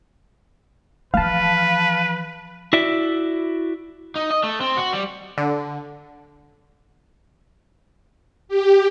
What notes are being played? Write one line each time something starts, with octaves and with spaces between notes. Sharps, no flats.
E3 F3 B4 F5 A5
E4 F#4 D5 E5
D#4
D#5
A3
C4
F#4
G3
D3
G4